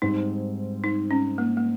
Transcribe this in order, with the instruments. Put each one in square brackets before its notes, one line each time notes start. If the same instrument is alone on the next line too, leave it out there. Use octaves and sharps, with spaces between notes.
[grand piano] G#2 G3 C4 [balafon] D#4
[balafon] D#4
C#4
A#3
A#3